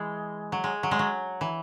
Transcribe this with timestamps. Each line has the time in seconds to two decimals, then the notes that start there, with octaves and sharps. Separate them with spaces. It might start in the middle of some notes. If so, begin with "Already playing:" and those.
Already playing: E3 G#3
0.52 F#3
0.64 G#3
0.83 F#3
0.91 G#3
0.99 F#3
1.41 E3